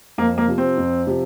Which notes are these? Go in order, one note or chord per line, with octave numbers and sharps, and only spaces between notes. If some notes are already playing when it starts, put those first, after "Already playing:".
F2 A#3
A#3
C3 F3
C4
F2
C3 F3